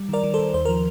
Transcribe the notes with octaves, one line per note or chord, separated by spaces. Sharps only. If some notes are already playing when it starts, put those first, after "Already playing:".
Already playing: G3
D#3 A#4 D5
D#3
A4 C5
D#3
D#2 C5
F3 A#4